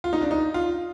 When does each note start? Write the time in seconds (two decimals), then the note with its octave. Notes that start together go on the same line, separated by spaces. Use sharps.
0.04 F4
0.13 D#4
0.21 D4
0.31 D#4
0.54 F4